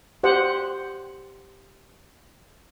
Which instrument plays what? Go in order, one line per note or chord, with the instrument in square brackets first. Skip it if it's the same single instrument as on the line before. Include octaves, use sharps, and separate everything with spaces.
[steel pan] G4 C5 F#5